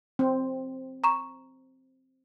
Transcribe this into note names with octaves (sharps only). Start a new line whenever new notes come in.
C4
A#5 C#6 E7